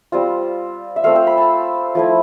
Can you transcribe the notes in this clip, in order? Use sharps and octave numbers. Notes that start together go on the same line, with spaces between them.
G3 C4 F4
E5
A3 C4 F4 F5
G5
B5
A5
F3 A3 E4